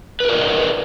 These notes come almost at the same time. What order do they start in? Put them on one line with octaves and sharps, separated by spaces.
B4 A#4 D5 D#5